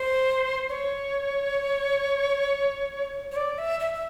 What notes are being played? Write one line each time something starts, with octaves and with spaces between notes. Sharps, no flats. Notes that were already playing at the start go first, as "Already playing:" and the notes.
Already playing: C5
C#5
C#5
D5
E5
E5
E5